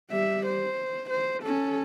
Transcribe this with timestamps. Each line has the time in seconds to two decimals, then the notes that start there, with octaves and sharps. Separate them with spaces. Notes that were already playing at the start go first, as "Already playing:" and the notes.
0.10 G3 E5
0.46 C5
1.10 C5
1.43 C#4 A4